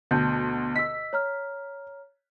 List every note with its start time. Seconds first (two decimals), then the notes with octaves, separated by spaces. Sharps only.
0.11 D2 B2 A5 G6
0.76 D#5 E6 B6
1.13 C#5 A#5 F6